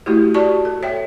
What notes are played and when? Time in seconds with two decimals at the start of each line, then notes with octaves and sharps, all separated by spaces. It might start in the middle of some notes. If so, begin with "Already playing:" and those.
0.06 A3 E4 F#4 G4
0.34 F#4 G4 D5 A5 C#6
0.65 A4
0.83 C#5 E5 G5